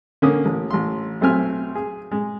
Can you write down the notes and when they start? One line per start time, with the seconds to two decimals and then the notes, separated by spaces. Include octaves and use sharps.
0.22 D3 A#3 C#4 D#6
0.45 A1
0.71 A1 C6
1.21 B1 A3 C4 G#5 F6
1.75 G#4
2.12 G#3